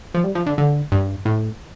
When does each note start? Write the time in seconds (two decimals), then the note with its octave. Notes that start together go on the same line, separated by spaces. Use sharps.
0.14 F3
0.24 G3
0.35 F3
0.46 D3
0.58 D3
0.92 G2
1.25 A2